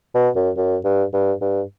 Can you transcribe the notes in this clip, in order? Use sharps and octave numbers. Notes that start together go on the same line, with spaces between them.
B2
F#2
F#2
G2
G2
G2